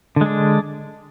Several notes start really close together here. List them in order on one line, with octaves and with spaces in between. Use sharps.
D3 G#3 D4